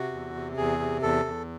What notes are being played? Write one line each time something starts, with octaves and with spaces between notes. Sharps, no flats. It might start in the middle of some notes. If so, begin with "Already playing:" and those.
Already playing: C3 F#4
E2
C3
E2 G#4
C3
E2 A4
E2